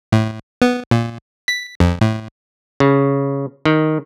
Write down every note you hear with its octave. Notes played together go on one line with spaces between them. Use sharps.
A2
B3
A#2
B6
F2
A2
C#3
D#3